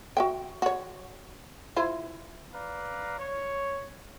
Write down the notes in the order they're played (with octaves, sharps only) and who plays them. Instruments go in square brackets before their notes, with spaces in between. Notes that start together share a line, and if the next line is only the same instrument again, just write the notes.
[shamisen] F#4 E5 G5
F#4 C#5
E4 F4 C5
[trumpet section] B4 D5 F5 A#5
C#5